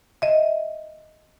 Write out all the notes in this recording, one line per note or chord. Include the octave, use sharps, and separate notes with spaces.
D#5 E5